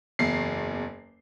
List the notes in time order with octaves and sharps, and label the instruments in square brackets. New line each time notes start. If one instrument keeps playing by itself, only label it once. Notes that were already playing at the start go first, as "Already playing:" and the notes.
[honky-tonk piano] F#1 E2 C7